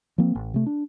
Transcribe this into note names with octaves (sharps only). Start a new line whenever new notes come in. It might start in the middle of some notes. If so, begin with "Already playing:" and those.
F3 A#3 C4
A1
C3 A3
D4